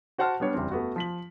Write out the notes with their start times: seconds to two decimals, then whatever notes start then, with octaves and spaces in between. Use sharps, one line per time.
0.18 F#4 C5 F#5 A5 F6
0.40 G3 B3 D4 C#5
0.54 F#1 E2 G3 C4
0.71 A3 B3 F#4
0.96 F3 B6 F#7